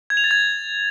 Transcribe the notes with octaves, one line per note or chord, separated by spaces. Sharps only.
G#6
F7
A6
G#6